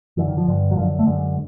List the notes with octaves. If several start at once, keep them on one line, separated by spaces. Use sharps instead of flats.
F#2 D3 E3
D#3
F3
G2 D3
F#3
F#2 D3 F3
A3
F#2 D3 G#3